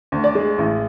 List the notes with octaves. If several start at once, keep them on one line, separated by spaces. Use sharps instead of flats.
D2
D5
G#3
A1